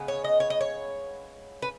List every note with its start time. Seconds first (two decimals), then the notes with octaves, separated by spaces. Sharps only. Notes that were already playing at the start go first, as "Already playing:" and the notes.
Already playing: C#3 G#3 B3
0.08 C#5
0.24 D#5
0.40 C#5
0.50 D#5
0.61 C#5
1.62 B4